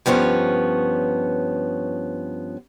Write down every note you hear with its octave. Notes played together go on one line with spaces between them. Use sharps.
G2 F3 B3 C#4 C#5